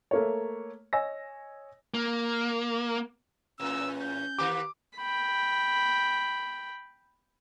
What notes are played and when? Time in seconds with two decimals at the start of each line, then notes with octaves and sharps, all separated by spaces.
0.11 A3 A#3 C#5
0.93 C#5 D#5 G#5 E6 A#6
1.94 A#3
3.60 E2 A2 C#4 E6
4.02 G6
4.39 D#3 A#3 G4 D6
4.98 G5 B5